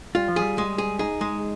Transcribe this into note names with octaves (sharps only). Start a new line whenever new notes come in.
G3 F4
F3
G3 G#4
G#3
G#4
D#4 G#4
G#3